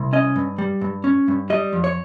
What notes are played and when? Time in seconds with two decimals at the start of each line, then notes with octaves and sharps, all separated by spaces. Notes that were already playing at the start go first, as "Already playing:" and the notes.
Already playing: C2
0.13 C#4 D#5
0.36 G2
0.58 G3
0.81 G2
1.04 C#4
1.28 G2
1.50 G3 D#5
1.73 F2
1.84 C#5